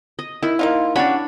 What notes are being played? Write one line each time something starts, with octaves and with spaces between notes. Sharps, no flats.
D#5
D#3 E4
A#3 D#4 F4
G3 C#4 D4 F#4 C#5 B5